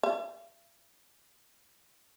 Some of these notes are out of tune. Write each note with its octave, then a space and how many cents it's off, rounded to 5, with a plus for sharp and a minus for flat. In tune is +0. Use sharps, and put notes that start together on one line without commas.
E5 +45